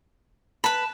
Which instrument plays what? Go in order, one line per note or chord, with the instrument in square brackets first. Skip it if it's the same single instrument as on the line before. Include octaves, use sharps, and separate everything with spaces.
[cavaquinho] B4 B5 [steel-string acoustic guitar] A5